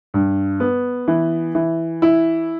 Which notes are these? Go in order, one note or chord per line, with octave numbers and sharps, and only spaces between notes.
G2
B3
E3
E3
E4